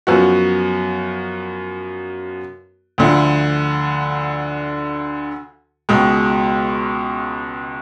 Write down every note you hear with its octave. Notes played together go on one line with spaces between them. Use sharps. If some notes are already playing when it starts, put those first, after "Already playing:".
F#2 F3 B3 F#4
D2 D3 F3
C#2 B2 G#3